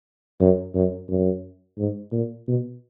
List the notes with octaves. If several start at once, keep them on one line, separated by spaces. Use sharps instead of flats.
F#2
F#2
F#2
G#2
A#2
B2